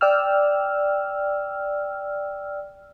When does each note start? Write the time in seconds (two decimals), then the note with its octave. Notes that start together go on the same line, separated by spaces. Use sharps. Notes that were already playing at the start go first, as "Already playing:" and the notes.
0.01 D5 G5 E6 F6